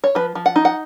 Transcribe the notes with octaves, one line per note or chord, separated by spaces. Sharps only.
C#5
F3 B4
F3
F#5
D#4
F#5